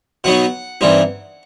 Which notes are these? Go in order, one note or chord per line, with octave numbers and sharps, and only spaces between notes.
B2 F#3 B3 D#4 F#5
G2 E3 G3 C4 D#4